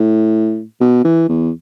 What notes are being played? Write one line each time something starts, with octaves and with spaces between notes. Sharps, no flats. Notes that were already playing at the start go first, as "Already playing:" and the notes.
Already playing: A2
B2
E3
E2